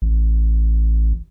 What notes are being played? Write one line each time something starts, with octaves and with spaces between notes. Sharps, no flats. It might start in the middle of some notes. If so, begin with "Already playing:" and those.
A1